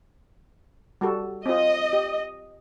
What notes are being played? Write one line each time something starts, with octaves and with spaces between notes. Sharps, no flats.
G3 F#4 A4
C4 F4 D#5
G4